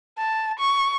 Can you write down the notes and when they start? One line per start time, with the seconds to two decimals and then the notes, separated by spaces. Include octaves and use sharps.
0.19 A5
0.59 C#6